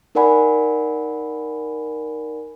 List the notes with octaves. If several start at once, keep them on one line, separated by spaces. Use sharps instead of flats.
D#4 A#4 D5 F#5 G#5 B5